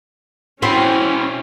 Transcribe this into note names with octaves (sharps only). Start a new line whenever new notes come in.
B2 E3 C4 C#4 E4 C5 C6